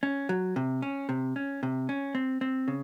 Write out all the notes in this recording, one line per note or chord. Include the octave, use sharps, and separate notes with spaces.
C#4
F#3
C3
C#4
C3
C#4
C3
C#4
C4
C4
C#3